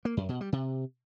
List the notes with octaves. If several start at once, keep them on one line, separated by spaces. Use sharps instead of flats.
A#3
F#2
B2
G3
C3